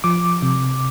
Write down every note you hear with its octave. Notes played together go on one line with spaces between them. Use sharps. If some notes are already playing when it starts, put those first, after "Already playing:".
F3 D6
C3